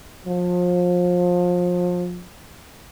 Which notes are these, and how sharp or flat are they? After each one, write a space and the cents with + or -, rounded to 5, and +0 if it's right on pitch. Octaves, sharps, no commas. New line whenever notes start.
F3 +30